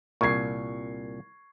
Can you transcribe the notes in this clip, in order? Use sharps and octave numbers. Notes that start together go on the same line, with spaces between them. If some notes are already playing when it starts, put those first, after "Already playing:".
C2 A#2 C#6 G#6 C7